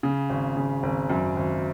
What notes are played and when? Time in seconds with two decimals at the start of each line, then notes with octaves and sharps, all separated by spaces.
0.03 C#3
0.30 G#1
0.57 C#3
0.83 G#1
1.10 F#2
1.37 G#1